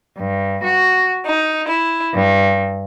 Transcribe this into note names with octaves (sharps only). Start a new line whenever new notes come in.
G2
F#4
D#4
E4
G2